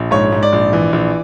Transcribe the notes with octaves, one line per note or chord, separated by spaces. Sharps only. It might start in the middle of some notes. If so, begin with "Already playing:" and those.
Already playing: A#1
G#2 C#5
G#2
D5
A#1
E3
A#1